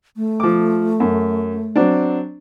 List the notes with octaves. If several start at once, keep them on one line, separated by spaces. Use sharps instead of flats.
A3
F3 D6
F#2
F#3 C4 D4